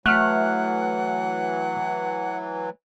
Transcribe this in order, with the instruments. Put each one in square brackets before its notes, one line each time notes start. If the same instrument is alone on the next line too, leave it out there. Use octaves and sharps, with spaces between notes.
[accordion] E3 F#3 [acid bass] A3 [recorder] F#5 [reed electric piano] F6 F#6